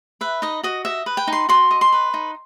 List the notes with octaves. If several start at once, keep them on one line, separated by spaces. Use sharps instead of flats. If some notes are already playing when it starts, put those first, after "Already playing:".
B4 E5
D#4 D#5
F#4 D#5
D#5 E5
B4
G5
D#4
C6
F#4 C6
D#5
C6
B4
D#4